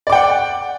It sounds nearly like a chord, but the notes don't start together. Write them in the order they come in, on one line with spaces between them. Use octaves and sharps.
D5 D6 G5 F#5